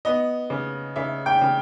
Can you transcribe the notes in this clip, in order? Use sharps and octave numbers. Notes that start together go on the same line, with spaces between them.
B3 D#5
C#3
C#3 E5
G5
C#3